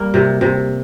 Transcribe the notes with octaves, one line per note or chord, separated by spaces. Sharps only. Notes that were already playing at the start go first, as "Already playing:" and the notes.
Already playing: G3 A#3
C3
C3